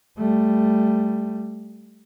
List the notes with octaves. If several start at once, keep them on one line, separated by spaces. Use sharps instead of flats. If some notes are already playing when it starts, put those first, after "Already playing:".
G3 A3